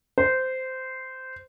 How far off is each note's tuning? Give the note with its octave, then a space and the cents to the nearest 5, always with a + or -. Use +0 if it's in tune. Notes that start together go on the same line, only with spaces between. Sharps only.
C5 -15